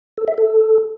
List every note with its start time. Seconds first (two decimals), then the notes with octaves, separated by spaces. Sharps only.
0.18 A4
0.28 E5
0.38 A4